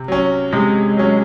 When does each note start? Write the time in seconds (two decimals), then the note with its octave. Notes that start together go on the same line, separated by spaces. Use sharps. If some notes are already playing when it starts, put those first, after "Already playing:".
Already playing: C3
0.08 F#3 C#4
0.52 C3 G#3
0.97 F#3 C#4